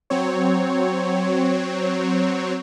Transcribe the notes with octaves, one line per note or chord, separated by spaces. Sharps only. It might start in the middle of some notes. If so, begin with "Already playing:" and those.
F#3 C4 C#5